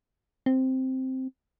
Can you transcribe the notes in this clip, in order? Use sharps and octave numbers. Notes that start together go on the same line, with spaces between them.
C4